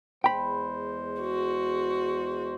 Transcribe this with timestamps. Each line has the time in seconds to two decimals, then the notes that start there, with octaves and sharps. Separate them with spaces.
0.24 E2 G#3 C5 G5 B5
1.21 F#4